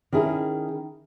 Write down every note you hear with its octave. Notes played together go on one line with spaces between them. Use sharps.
D#3 C#4 E4 G#4